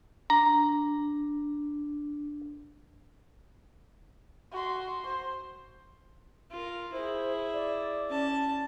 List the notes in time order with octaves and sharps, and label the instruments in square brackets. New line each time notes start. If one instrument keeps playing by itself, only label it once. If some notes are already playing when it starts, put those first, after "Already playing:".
[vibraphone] D4 [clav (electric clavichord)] A#5
[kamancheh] F#4 C6
C5
[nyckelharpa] F4 A#4
[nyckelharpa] E4 G#4 [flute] C5
[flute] D5
[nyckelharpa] C#4 A5